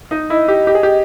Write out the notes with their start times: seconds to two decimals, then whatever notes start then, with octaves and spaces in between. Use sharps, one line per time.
0.11 D#4
0.30 E4 D#5
0.48 G4
0.67 G4
0.75 G#4
0.83 G4